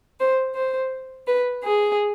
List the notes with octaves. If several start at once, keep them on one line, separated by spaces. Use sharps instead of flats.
C5
C5
B4
G#4